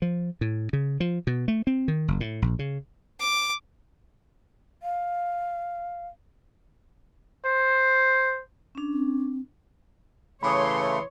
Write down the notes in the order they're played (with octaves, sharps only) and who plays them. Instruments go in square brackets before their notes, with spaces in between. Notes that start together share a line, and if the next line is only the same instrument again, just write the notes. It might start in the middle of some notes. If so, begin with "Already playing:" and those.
[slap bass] F3
A2
C#3
F3
B2
A3
C4
D#3
F#1
A2
A#1
C#3
[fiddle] D6
[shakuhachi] F5
[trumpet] C5
[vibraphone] C#4 D4
[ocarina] C4
[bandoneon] C#3 A3 [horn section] E3 C6 [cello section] C#5 [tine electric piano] B5 D6 D#6